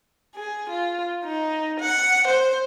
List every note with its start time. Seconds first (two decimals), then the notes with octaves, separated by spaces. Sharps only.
0.35 G#4
0.69 F4
1.24 D#4
1.79 F#5
2.27 C5